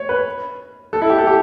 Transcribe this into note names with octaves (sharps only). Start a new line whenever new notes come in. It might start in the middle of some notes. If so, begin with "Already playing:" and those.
Already playing: C#5
B4
A4
E4
G4
A4
G4